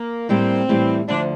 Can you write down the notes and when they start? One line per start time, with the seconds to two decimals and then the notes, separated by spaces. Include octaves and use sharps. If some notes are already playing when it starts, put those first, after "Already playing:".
Already playing: A#3
0.29 A2 G3 A#3 C4
0.69 A2 E3 G3
1.08 D2 D3 F3 D4